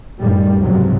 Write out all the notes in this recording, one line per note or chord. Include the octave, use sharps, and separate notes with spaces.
F#2 A2 D#3 G3
C#2 G#2 C3 F3 F#3